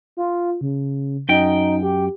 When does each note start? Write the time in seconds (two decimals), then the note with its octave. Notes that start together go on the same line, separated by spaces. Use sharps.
0.17 F4
0.61 C#3
1.29 F#2 D#4 G5
1.83 G4